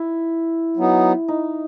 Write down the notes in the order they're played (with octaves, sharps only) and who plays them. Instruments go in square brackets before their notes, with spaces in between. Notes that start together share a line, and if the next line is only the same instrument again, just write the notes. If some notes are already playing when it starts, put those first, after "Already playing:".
Already playing: [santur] E4
[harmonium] F#3 B3 D#4
[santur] D#4